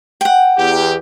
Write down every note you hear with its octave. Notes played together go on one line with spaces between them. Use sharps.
F#5 G5
E2 G4